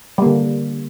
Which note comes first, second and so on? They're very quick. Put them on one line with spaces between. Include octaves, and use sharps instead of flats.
G3 A#3 D3